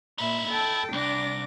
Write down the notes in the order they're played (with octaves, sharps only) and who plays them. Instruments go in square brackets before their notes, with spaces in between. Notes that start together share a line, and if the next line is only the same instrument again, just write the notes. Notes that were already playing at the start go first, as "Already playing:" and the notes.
[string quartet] A#2 E5 B5 [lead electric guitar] D#4 E4
[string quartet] A4 G5 A5
[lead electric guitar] C2 [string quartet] D4 D6 A#6